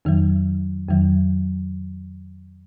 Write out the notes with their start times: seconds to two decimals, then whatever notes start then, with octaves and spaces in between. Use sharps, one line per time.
0.05 F2 D#3 F#3
0.88 F2 D#3 F#3